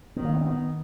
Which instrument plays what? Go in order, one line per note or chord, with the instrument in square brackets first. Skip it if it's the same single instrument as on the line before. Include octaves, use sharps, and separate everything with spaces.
[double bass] D#3 [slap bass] B3
[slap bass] A#3
B3
C4
[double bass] D#3 [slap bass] B3